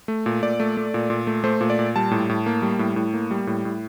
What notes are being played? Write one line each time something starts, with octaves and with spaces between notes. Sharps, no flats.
A3
A#2
A#2 D5
A3
A3
A#2
A#2
A3
A3 C5
A#2
D5
A#2
G3 A5
A2
A2
A#3
G3
A2
A2
A#3
G3
A2
A2